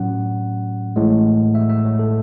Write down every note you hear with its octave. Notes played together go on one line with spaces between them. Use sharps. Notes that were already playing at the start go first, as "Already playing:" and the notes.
Already playing: A2 F#3 C#4 F#5
A1 A2 G#3
E5
E5
C#5
A4